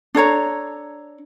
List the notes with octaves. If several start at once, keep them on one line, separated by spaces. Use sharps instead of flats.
D4 A4 C#5 A#5